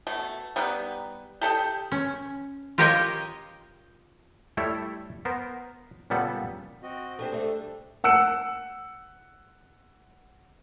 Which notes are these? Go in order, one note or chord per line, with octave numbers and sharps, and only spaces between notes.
B2 A3
G3 B3 D#4 B4
G4 A4 D#5 G5
C#4
F4 G4 A#4 C#5 D#5 G5
G3 A3 E4 A4 C#5 E5
B3 A#4 C5
A#2 C#3 G3 B3 A4 F#5
C4 F#4 D#5
A3 D4 G4 C5
G3 A3
F#5 E6 F#6 C#7